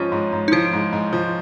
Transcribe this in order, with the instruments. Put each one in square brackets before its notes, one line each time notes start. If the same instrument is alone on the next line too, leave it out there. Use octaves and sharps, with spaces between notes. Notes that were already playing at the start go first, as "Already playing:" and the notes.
Already playing: [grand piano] G#2 F3 C#4 [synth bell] F4
[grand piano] G#2
G#2
[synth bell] D#4
[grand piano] F3 [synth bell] E4
[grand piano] G#2
G#2
F3